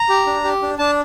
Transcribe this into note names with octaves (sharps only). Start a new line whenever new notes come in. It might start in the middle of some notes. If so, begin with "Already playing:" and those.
Already playing: A#5
G4
D4
G4
D4
D4 A5